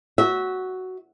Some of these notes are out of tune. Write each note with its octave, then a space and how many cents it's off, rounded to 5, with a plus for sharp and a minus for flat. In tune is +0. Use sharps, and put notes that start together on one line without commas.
F#4 +5 E5 -20